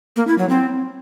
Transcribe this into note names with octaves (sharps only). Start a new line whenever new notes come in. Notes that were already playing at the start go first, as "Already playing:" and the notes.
A#3
E4
F#3
C4